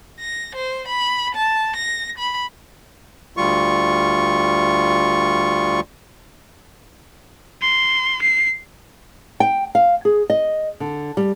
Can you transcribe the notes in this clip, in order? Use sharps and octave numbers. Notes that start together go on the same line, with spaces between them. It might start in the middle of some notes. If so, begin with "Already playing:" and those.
A#6
C5
B5
A5
A#6
B5
D2 G3 F4 C#6
C6
C7
G5
F5
G#4
D#5
D3
G3